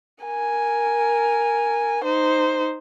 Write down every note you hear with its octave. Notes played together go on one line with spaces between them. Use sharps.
A#4 G#5
D#4 C5